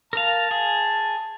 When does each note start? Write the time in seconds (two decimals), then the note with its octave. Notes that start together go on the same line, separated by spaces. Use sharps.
0.13 A#4 F5 A5
0.51 G#4